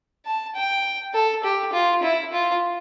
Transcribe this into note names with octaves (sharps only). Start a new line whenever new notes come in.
A5
G5
A4
G4
F4
E4
F4